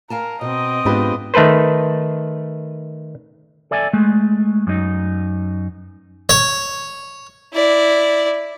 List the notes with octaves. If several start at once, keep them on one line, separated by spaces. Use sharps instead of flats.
A#4 F5 G#5 A5
B2 C4 D#5
G#2 G#3 B3 D4 F4 G4 B4
D#3 A3 A4 B4 C5
A4 D5 E5 G#5
G#3 A3
F#2 D#4
C#5
E4 D5